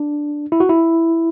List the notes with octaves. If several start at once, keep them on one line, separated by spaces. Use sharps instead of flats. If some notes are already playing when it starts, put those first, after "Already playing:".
Already playing: D4
E4
F#4
E4